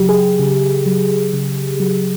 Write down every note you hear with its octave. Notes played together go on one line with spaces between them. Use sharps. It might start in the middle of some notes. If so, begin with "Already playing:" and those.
Already playing: C#3 F#3 G4
G#4
C#3
F#3
C#3
F#3